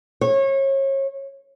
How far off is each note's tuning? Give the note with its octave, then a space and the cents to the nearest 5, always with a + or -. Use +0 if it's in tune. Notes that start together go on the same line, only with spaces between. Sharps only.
C#5 -30